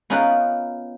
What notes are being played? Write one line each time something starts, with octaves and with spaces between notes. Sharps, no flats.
B3 C#4 D#4 F4 A#4 B4